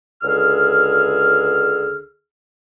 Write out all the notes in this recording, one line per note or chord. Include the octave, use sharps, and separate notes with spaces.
C#2 D3 G#4 E6 F6